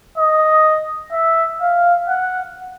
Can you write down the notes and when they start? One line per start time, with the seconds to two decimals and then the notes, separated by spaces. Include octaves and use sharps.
0.18 D#5
1.12 E5
1.61 F5
2.08 F#5